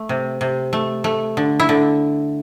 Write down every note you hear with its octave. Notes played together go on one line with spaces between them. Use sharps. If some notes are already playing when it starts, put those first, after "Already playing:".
Already playing: A3
C3
C3
A3
A3
D3
E4
D3